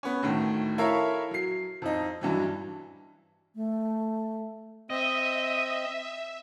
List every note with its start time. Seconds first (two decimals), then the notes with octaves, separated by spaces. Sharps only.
0.03 B3 C#4
0.23 D2 A2 D#3
0.78 E4 A4 A#4 C#5 E5 F5
1.31 F#3 C7
1.82 F2 D#4
2.21 G2 E3 F#3
3.55 A3
4.90 C4 D#5 E5